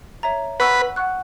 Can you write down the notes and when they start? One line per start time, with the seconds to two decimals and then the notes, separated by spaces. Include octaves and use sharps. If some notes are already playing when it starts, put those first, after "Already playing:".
0.23 C#5 E5 A#5
0.60 B4 F#5 C#6 E6
0.96 F#5 C#6 F#6